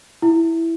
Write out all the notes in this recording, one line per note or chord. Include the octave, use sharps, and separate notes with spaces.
E4